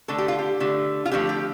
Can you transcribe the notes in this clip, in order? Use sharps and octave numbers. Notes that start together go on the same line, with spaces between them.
D3 A3 A4
G4
F4
G4
D3 A3
F4
D3 F3 A3 G4
G4